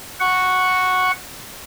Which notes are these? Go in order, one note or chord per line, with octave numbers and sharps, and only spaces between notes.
F#5 C#6